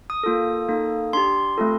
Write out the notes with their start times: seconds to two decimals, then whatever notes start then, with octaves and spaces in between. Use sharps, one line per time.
0.10 D#6
0.23 A#3 F4 A4
0.68 A#3 D#4 A4
1.13 D4 G4 C6
1.58 A3 C4 F4 A4